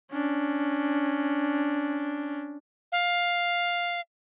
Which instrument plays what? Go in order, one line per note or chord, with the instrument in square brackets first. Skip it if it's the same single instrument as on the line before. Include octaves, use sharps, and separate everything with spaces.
[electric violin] C#4 D4
[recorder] F5